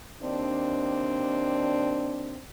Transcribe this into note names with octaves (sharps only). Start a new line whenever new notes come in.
D#2 C4 D4